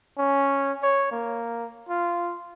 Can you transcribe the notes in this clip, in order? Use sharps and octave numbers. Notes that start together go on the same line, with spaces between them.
C#4
C#5
A#3
F4